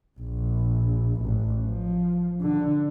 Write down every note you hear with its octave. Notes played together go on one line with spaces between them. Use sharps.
A#1
A1
F3
D3